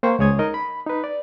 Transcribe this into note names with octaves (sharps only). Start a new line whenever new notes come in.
A#3 C5 G5 C#6
C#2 G#3 C#5 D#6 G#6
D#4 A#4 D#5
B5
D#4 B4
D5